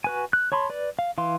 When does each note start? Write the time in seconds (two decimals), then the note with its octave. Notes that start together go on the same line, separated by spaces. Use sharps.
0.04 F#4 B4 G#5
0.33 F#6
0.52 C#5 A5 B5 C6
0.69 B4 D5
0.99 F5
1.18 E3 F5 C6